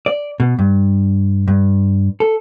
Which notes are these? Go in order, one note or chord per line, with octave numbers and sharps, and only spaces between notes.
D5
B2
G2
G2
A4